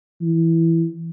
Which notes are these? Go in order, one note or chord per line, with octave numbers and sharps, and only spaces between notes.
E3